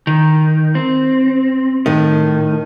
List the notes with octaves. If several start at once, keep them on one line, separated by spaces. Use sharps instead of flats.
D#3
C4
A2 D#3